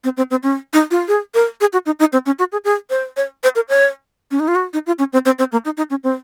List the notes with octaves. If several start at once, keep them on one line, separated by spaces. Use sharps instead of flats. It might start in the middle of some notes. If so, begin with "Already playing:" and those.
C4
C4
C4
C#4
D#4
F4
G#4
A#4
G#4
F#4
D#4
D#4
C4
C#4
F#4
G#4
G#4
C5
C#5
C5
A#4
C#5
C#4
D#4
F4
F#4
D#4
F4
C#4
C4
C4
C4
A#3
D#4
D#4
C#4
C4